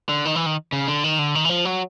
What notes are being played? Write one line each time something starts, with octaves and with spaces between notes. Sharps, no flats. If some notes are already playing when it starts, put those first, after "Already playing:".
D3
D#3
E3
D#3
C#3
D3
D#3
D3
D#3
E3
F3
F#3